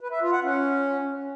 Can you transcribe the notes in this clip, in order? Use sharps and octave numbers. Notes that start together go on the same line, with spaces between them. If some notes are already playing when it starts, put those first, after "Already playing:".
B4
E5
F4
F#5
C#4